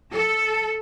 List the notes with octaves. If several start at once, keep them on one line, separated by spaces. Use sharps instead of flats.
A4